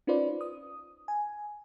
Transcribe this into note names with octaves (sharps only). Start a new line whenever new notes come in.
C#4 D#4 F4 B4 C5 D5
D#6
G#5